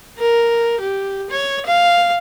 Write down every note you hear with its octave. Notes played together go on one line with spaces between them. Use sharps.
A#4
G4
C#5
F5